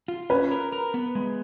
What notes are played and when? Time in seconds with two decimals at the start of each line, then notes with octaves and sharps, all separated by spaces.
0.08 F4
0.30 C#4 B4
0.51 A#4
0.72 A#4
0.94 B3
1.15 G#3